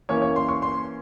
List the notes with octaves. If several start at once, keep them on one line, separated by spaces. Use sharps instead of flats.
E3 A#3 C#4 C#5
C#5
C6
C#6
C6